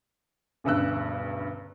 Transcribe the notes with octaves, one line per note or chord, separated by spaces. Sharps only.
E1 D2 G2 C#3 E6 F#6